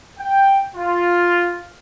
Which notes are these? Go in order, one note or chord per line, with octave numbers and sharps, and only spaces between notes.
G5
F4